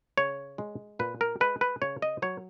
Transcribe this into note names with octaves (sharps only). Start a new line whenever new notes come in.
C#3 C#5
G#3
A#2 B4
A#4
G#3 B4
B4
C#3 C#5
D#5
F#3 C#5